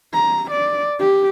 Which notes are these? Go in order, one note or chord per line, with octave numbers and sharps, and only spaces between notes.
A#5
D5
G4